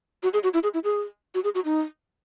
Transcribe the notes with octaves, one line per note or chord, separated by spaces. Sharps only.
F#4
G#4
F#4
E4
G#4
E4
G#4
F#4
G#4
F#4
D#4